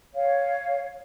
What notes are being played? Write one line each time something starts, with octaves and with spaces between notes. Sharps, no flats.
C#5 F5